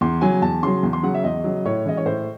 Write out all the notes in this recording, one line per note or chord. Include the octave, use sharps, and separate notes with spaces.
E2 C6
C#3 F#3 G#5
E2 A5
C#3 F#3 C6
E2
C6
C#3 F#3 F#5
E5
E2 D#5
C#3 F#3
A2 C#5
E3 G#3 C#4 D#5
C#5
A2 C5